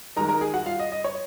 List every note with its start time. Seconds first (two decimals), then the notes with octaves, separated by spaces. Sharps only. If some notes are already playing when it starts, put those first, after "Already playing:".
0.16 D#3 G#3 D#4 A#4 A#5
0.29 A#4 A#5
0.41 G#4 G#5
0.53 F#4 F#5
0.66 F4 F5
0.79 D#5
0.92 D#5
1.04 C#5